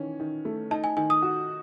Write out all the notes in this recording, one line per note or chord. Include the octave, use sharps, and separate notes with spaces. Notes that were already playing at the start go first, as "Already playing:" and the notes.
Already playing: D#3 E3 C#4
D#3
A3
D#4 A5
G#5
D#3 G#5
D#6
F#4